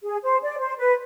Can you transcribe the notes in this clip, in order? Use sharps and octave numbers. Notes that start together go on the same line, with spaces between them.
G#4
C5
D5
C5
B4